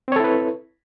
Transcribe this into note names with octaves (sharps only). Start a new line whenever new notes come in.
C4 E4 A4 B4 C#5